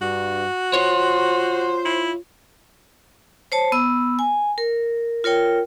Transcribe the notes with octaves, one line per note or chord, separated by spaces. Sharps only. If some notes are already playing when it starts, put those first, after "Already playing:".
G2 F#4
F4 C5 C#5
E4
C5 C#5 A5
B3 E6
G#5
A#4
F4 A#4 C#5 G5